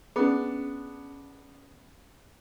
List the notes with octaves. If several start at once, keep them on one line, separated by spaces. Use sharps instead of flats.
B3 C#4 D4 G#4